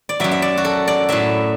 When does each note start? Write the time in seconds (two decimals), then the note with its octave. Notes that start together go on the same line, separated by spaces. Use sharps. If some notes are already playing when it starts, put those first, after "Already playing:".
0.09 D5
0.20 F#2 F#3 E5
0.31 E5
0.42 D5
0.58 F#4
0.65 A4
0.88 D5
1.09 A2 F#3 E5